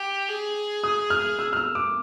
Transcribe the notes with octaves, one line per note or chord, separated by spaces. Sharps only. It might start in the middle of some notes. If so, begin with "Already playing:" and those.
Already playing: G4
G#4
D#6
F6
E6
F6
E6
D6